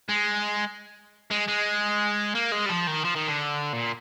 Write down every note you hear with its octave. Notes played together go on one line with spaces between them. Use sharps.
G#3
G#3
G#3
A#3
G#3
G3
F3
D#3
F3
D#3
D3
A#2